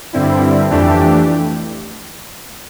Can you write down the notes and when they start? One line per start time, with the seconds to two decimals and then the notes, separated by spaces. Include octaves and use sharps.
0.13 G2 D3 G3 C4 E4
0.70 F2 E3 A3 D4 G4